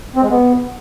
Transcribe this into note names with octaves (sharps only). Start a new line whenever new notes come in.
C4
G#3
B3